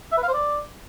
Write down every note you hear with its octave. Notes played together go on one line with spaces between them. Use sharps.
E5
B4
F5
C5
D5